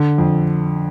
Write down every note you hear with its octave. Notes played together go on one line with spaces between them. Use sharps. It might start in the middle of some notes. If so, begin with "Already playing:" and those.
Already playing: D3
F2